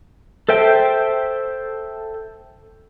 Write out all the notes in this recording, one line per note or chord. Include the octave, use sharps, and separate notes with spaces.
A4 C5 E5 G5